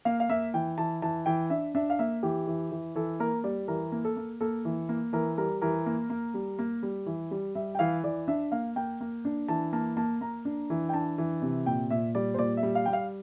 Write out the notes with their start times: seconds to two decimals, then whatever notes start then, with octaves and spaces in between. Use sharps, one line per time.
0.05 A#3 F5
0.20 F5
0.29 A#3 E5
0.54 E3 G5
0.78 E3 A5
1.02 E3 A5
1.26 E3 G5
1.50 D4 E5
1.75 D4 E5
1.90 F5
1.99 A#3 E5
2.23 E3 G4
2.47 E3
2.71 E3
2.96 E3 A4
3.20 A#3 A#4
3.44 G3 D5
3.68 E3 A#4
3.92 A#3
4.05 A4
4.17 A#3
4.41 A#3 A4
4.65 E3
4.89 A#3
5.13 E3 A#4
5.38 G3 A#4
5.62 E3 A#4
5.86 A#3
6.10 A#3
6.34 G3
6.59 A#3
6.83 G3
7.06 E3
7.31 G3
7.55 G3 E5
7.75 G5
7.79 E3 F5
8.04 E3 D5
8.28 D4 E5
8.52 A#3 F5
8.76 A#3 G5
9.01 A#3
9.25 D4
9.48 E3 A5
9.73 A#3 A5
9.97 A#3 A5
10.21 A#3 A#5
10.45 D4
10.70 E3
10.89 G5
10.94 D4 A5
11.18 E3
11.42 C3
11.66 A#2 G5
11.90 A#2 E5
12.15 G3 D5
12.34 C5
12.38 A#2 D5
12.57 E5
12.63 G3
12.75 F5
12.86 G3 G5
12.93 F5